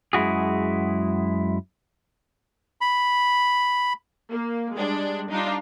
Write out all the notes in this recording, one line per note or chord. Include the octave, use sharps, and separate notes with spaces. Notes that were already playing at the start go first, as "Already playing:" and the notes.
F#2 G#3 E4 F#4 G#4
B5
A#3
G3 G#3 D4
G3 D4 D#4 F4